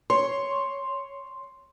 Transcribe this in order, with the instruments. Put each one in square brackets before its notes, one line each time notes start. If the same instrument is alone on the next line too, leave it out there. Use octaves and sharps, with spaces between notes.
[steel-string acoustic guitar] C#5 [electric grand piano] C6